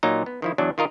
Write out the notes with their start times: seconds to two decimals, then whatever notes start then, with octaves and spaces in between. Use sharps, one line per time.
0.03 A#2 F#3 D#4 F5 A#5
0.26 B3
0.42 D#3 F3 E4
0.58 E2 F#3 D4
0.78 D#3 F4 A#4 D#5